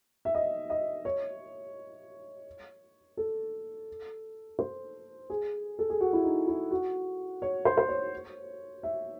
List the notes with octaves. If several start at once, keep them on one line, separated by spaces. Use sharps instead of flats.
E5
D#5
D#5
C#5
A4
C5
G#4
A4
G#4
F#4
E4
D#4
E4
F#4
C#5
C5
C5
C#5
E5